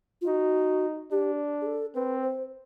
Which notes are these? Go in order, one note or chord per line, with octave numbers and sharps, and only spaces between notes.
F4
D#4 F#4
D4 G4
G#4
A4
C4 B4
C5